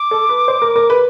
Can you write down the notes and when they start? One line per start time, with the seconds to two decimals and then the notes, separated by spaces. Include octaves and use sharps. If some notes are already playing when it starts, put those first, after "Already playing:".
Already playing: D6
0.11 A4
0.29 B4
0.48 C5
0.62 A#4
0.76 A#4
0.90 B4